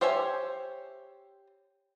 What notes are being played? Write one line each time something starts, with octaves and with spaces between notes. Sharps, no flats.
G4 C5 C#5 E5 G#5